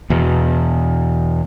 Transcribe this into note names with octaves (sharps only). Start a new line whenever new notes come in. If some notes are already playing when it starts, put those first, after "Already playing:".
E2 B2